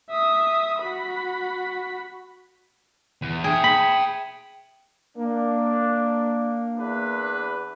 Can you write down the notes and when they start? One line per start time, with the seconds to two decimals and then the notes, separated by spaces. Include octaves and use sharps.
0.10 E5 D#6
0.79 F#4 B5
3.22 E2
3.44 G#4 E5 G5
3.64 B5
5.18 A#3 D4
6.78 E2 D4 B4